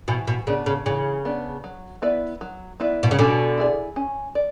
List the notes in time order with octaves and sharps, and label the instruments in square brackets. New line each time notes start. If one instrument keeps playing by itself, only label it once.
[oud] B2 [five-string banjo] E3
[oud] B2
[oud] C#3 [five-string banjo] B3 D4
[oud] C#3
[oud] C#3 [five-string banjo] E3
[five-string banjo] B3 D4
F#3
B3 E4 B4 D5
F#3
B3 E4 B4 D5
[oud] B2
C#3
[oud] B2 D3 [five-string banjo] C#4
[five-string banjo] E4 G#4 D5
C#4
D5